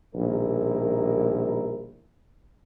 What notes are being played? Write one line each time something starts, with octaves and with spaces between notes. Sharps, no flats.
A#1 B2 D#3 G3 E4 A#4